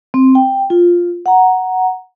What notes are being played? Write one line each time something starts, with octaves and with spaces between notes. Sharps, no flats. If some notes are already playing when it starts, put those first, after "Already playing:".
C4
G5
F4
F#5 A#5